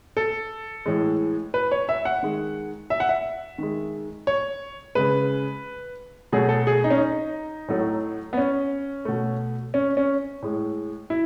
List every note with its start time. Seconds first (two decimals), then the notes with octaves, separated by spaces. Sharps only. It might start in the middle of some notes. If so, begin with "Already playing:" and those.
0.17 A4
0.86 A2 E3 G#3
1.54 B4
1.72 C#5
1.89 E5
2.05 F#5
2.23 D#3 G#3
2.90 E5
3.00 F#5
3.09 E5
3.58 D#3 G#3
4.27 C#5
4.95 C#3 G#3 B4
6.32 B2 F#3 A3 G#4
6.49 A4
6.67 G#4
6.84 D#4
6.90 C#4
6.98 D#4
7.68 A2 F#3 A3
8.33 B3
8.37 C#4
9.05 B2 A3
9.74 C#4
9.97 C#4
10.42 A2 G#3
11.10 E4